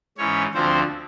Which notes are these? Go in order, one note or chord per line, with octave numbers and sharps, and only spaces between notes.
G#2 E3 C#4 C#5
D2 D3 F3 C4 C5